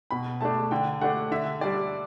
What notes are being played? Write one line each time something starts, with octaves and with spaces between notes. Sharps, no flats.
B2 B5
A3 D4 A5
D3 G5
A3 D4 F#5
D3 E5
G3 D4 D5